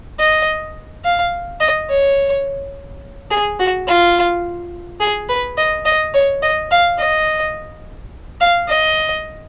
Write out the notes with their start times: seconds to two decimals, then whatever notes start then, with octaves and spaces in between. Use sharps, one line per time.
0.19 D#5
1.04 F5
1.61 D#5
1.89 C#5
3.31 G#4
3.59 F#4
3.87 F4
5.00 G#4
5.29 B4
5.58 D#5
5.85 D#5
6.14 C#5
6.42 D#5
6.71 F5
6.99 D#5
8.40 F5
8.68 D#5